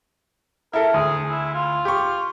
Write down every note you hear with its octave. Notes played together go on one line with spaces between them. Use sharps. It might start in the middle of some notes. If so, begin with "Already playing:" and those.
E4 A4 A#4
D2 G#4
E4
F4
G4 C#6